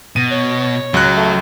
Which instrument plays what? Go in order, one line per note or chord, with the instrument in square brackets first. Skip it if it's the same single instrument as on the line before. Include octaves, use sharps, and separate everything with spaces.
[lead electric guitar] B2 [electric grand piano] D#7
[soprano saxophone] C#5
[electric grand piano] C#2 F#6 [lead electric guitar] F#3
[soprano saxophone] A3